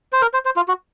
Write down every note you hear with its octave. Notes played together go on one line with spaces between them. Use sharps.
C5
A#4
C5
C5
F4
F#4